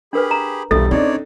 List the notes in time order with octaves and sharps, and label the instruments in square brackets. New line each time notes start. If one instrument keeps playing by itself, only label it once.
[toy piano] D4 A#4 B4 [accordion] G4 G#4 B5
[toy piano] A#5
[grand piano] E1 G3 A6 [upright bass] B1 [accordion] F3 A3 [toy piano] A4
[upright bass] C#3 [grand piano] C4 D4 D#4 [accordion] C#5 D5